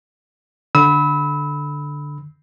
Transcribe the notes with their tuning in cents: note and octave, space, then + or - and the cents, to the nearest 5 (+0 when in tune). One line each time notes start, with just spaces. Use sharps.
D3 +0 B5 +0 E6 -30